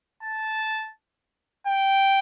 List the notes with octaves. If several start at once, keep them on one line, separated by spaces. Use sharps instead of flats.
A5
G5